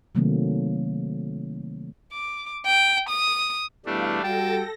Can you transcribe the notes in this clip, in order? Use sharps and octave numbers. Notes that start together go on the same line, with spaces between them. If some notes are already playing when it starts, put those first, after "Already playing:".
C3 D#3 F#3 A3 A#3 C4
D6
G5
D#6
E2 B2 E3 G3 A3 D4 F5
G3 F#4 A4 G5 A5 A#6